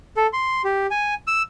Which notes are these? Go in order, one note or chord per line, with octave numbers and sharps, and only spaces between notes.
A4
C6
G4
G#5
E6